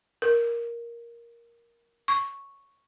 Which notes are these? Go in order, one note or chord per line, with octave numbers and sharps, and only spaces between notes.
A#4
C#6